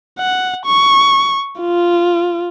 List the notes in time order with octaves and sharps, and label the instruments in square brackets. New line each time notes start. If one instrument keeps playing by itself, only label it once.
[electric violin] F#5
C#6
F4